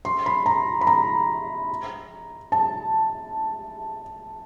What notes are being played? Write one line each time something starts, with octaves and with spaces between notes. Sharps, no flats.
C6
B5
A#5
B5
A#5
A5